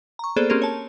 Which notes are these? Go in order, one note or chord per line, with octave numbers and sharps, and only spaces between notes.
A#5 C#6
A#3 B3 G#4 A4 C5 D5
A#3 C4 C#4 G4 G#4 A#4
C#5 A5